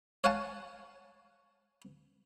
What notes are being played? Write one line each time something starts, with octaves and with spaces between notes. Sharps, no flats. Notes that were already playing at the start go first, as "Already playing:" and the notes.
C#5 F5 F#5 G#5 A5